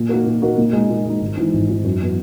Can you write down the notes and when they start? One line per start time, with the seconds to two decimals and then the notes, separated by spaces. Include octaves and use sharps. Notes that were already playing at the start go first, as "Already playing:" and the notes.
Already playing: A#2
0.09 A#3 D#4 F#4 A#4
0.26 A#2
0.42 A#3 D#4 F#4 A#4
0.58 A#2
0.73 G#3 D#4
0.89 A#2
1.06 G#3 D#4
1.21 G#1
1.37 G#2 E3
1.53 G#1
1.69 G#2 E3
1.84 F#2
2.00 E3 B3 F#4